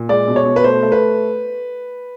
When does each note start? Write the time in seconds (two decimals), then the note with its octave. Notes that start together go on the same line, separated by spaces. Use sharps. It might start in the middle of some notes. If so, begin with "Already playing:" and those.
Already playing: A#2
0.09 G#3 D5
0.28 B2
0.36 C#5
0.46 B2
0.56 B4
0.64 A3 C5
0.83 A3
0.92 B4